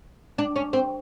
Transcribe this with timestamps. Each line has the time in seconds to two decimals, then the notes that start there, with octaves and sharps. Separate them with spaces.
0.38 D4
0.56 C#4
0.73 C4